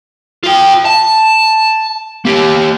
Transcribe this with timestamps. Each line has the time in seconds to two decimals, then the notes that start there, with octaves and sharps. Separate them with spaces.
0.44 F4 G5
0.85 A5
2.25 A#3 G4